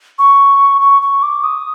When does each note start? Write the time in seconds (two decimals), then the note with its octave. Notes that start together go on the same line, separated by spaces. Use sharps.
0.19 C#6
0.81 C#6
1.02 C#6
1.23 D6
1.44 D#6